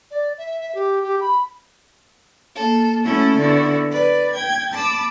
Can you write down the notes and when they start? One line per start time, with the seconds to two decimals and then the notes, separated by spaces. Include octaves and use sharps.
0.11 D5
0.38 E5
0.60 E5
0.75 G4
1.03 G4
1.21 B5
2.54 A#3 A4
3.04 A3 C#4 E4 F#4 A4
3.36 D3 B3 E4 F#4
3.92 B4 D5
4.33 G5 G#6
4.72 A5 B5 D6 E6